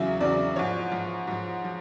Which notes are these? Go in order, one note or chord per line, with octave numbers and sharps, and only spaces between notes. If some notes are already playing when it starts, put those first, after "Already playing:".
Already playing: E2 C#3 F#3 E5
E2 C#3 F#3 D5
G#2 F3 C#5
G#2 F3
G#2 F3
F3